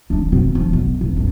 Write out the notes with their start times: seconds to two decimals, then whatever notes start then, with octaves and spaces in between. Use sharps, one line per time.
0.10 D4 D#4
0.32 B2 C4
0.55 F3 D4
0.73 B1
1.01 E1
1.16 A1 D#2